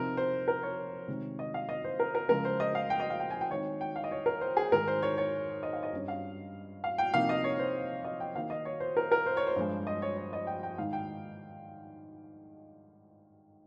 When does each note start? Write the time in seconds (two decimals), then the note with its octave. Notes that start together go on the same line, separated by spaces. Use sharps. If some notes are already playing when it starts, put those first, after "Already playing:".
Already playing: C3 F3 C4 D#4 A#4
0.17 C5
0.48 A#4
0.63 C#5
1.08 C3 D#3 G#3
1.39 D#5
1.54 F5
1.69 D#5
1.84 C5
2.00 A#4
2.15 A#4
2.29 C#3 F3 G#3 A#4
2.45 C5
2.60 D#5
2.75 F5
2.90 G5
3.00 D#5
3.10 F5
3.20 G5
3.30 G#5
3.41 G5
3.50 D#3 G#3 C4 D#4 C#5
3.81 G5
3.96 F5
4.04 D#5
4.11 C#5
4.26 A#4
4.41 C5
4.57 G#4
4.72 G#2 D#3 G#3 A#4
4.88 C5
5.02 C#5
5.18 C#5
5.63 D#5
5.73 F5
5.83 D#5
5.93 G2 G3 C#4
6.08 F5
6.84 F5
6.98 G5
7.14 C3 F3 A#3 D#4 F5
7.29 D#5
7.44 C#5
7.59 C5
8.04 D#5
8.20 G5
8.36 D#3 A#3 D#4 F5
8.50 D#5
8.65 C#5
8.80 C5
8.97 A#4
9.12 A#4
9.26 C5
9.37 C#5
9.47 C5
9.56 G2 F3 G#3
9.87 D#5
10.02 C#5
10.17 C#5
10.33 D#5
10.47 G5
10.63 G5
10.78 G#2 D#3 G#3 D#4 F5
10.93 G5